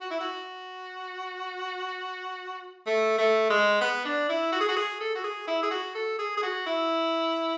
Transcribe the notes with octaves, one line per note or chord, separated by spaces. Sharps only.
F#4
E4
F#4
A3
A3
G#3
B3
D4
E4
F#4
G#4
F#4
G#4
A4
F#4
G#4
E4
G#4
F#4
A4
G#4
G#4
F#4
E4